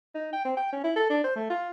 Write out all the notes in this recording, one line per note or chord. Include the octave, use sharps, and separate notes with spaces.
D#4
G5
C4
G5
C#4
E4
A4
D4
C5
A3
F4